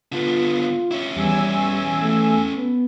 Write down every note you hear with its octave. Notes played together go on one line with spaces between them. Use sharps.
D3 B3 F4
C#4 E4
E2 G3 G#5 E6
A3
B3